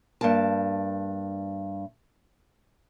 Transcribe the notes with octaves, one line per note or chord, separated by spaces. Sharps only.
G2 A#3 A5